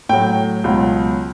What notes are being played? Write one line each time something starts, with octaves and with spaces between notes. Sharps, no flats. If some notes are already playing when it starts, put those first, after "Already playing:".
A2 F#3 G5
C#2 B2 F#3